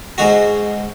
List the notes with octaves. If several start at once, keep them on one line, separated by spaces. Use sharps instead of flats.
G#2 G#3 D#4 F#4